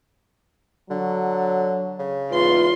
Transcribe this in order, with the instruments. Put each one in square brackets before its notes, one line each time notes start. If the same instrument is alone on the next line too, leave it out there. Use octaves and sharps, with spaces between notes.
[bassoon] D3 [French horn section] F#3
[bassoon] C#3
[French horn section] E2 G#2 B4 [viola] F4 C6